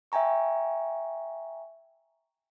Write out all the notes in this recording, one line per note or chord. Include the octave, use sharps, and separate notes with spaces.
E5 G5 G#5 A#5 C#6